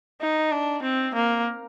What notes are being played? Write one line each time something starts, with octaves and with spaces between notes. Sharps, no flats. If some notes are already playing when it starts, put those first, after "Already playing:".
D#4
D4
C4
A#3